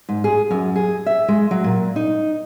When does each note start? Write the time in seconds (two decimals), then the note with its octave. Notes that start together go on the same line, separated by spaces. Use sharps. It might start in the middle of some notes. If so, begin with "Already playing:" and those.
0.09 G#2
0.24 G#4
0.51 F#2
0.76 G#4
1.06 E5
1.28 G#3
1.51 F#3
1.64 A#2
1.96 D#4